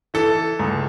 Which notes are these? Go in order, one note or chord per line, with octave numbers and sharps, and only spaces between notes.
E3 A4
C#2